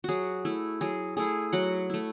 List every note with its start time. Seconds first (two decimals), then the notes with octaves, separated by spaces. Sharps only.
0.04 F#3 F#4 G#4
0.45 A3 E4
0.81 F#3 G#4
1.17 A3 E4 G#4
1.53 F#3 F#5
1.90 A3 E4